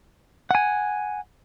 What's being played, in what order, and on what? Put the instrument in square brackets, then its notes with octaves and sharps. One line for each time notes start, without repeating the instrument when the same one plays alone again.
[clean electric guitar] F#5 G#5